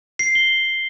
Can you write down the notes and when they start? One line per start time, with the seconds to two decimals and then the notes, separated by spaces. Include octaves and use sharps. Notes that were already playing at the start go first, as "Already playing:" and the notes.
0.19 C7
0.35 G7